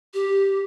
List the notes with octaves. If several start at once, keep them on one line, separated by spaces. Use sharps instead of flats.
G4